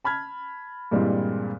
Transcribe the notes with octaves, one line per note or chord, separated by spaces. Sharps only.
A5 B5 F6 G#6
G2 A#2 E3 G3 G#3 C4